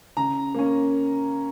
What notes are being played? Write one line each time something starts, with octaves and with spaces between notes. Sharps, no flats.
C#3 A#5
A#3 C#4